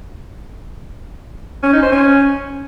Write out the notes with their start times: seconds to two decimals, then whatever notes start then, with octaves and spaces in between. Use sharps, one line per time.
1.63 C#4
1.73 D#4
1.82 C5
1.92 C#4